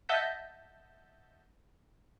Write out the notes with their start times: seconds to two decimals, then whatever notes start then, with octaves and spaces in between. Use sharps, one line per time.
0.09 D#5 E5 F#5 A5 G6 B6